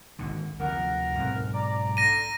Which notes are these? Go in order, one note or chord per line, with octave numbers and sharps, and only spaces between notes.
G#1 G#2 D3
D2 C3 F3 A#4 F#5
B1 G#2 C4
D5 A#5
D3 A#6 D#7